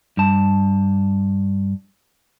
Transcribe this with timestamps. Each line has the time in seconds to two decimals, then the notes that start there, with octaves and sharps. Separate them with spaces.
0.17 G2 A5